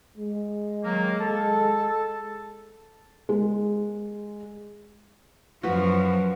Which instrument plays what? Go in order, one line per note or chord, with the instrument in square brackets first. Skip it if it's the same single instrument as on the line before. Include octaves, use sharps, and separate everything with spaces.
[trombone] G#3
[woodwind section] D#3 F#3 A#3
A4 A5
[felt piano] G#3
[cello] F#2 F3 [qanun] F#4 B4